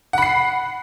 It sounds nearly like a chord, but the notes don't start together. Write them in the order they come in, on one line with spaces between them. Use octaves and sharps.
F#5 B5 C7